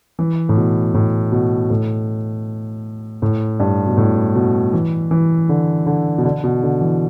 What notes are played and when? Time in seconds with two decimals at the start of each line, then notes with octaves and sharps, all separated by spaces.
0.19 E3
0.49 A2
0.57 B2
0.94 A2
1.32 B2
1.70 A2
3.22 A2
3.60 G2
3.87 B2
3.97 A2
4.35 B2
4.73 E3
5.11 E3
5.49 D3
5.86 D3
6.18 B2
6.25 D3
6.44 B2
6.63 D3
6.81 E3